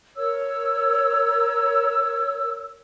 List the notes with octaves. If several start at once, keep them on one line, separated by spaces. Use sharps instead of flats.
A#4 C#5 E6